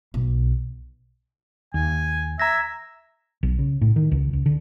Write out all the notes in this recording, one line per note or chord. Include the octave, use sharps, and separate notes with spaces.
B1
D#2 G#5
E5 A#5 G#6 A#6
B1
C#3
A2
D#3
C#2
C#2
D3